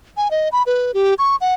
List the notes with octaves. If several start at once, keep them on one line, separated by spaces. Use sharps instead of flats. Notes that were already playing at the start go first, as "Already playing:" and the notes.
G#5
D#5
B5
B4
G4
C#6
F#5